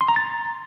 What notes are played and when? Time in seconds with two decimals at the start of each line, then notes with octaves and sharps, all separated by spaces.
0.01 C6
0.08 A#5
0.16 A6